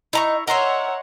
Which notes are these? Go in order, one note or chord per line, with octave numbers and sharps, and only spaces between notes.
D#4 E4 A#5 C#6
A#4 C#5 D#5 E5 F#5 A#5 C6